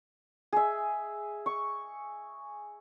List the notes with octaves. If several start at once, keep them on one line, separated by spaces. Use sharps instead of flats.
G#4 E5
C#6